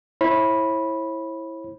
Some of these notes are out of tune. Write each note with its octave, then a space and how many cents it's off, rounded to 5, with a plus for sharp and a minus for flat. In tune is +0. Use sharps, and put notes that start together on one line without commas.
E4 +0 C#5 -45 B5 -10